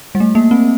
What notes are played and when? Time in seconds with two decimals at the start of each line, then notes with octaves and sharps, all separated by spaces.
0.15 G3
0.20 A3
0.35 A#3
0.51 C4